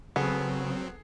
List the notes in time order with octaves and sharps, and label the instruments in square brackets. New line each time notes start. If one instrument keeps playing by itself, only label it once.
[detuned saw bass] C#3 [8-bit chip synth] F#3 C4 [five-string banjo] B3 [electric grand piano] G#4 A4